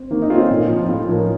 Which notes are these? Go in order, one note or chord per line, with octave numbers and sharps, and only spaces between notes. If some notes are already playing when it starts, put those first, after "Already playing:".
Already playing: C4
D#3 A#3
D#4
A3 C4 C#4 F4
A#2 D#4
F3 C4
A2 F4
F3 A#3 C#4